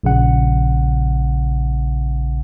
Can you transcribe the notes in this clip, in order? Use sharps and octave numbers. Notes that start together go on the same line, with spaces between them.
A#1 C#3 F#5